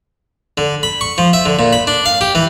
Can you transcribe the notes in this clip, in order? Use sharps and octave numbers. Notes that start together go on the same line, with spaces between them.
D3
B5
C#6
F3
E5
D3
A#2
B5
D4
F5
G4
E3